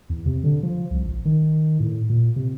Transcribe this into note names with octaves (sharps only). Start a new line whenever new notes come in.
E2
C3
D3
F3
C2
A1
D#3
A2
A#2
C3